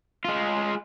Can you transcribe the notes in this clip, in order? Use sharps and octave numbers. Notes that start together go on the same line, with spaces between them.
G#3 F4